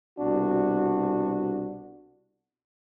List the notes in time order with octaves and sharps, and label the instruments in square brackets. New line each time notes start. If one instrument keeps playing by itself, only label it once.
[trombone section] C2 B2 D4 F#4